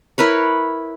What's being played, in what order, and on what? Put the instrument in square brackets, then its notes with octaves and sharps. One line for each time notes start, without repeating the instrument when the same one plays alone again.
[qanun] E4 A#4 B4 C#5